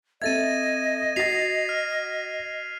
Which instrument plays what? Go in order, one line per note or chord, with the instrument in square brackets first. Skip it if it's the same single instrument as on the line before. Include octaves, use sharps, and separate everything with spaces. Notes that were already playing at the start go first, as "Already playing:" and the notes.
[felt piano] C4 A4 E5 [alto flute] D#5 [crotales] G#6 A6 D#7
[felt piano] F#4 A6 [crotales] B6 C7 F7
[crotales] F6